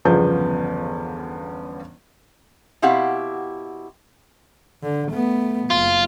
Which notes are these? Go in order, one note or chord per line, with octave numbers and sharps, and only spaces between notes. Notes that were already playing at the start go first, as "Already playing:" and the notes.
G1 E2 C#3 F3 B3 G6
B2 C4 E4 G4 F5 F#5
D3
A3 B3
F#1 F4